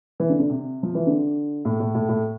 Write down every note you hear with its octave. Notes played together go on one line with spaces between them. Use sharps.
E3
D3
D3
C3
F3
E3
D3
A2
A2
A2
A2